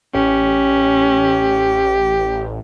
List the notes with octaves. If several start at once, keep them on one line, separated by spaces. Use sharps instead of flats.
A1 C#4 G4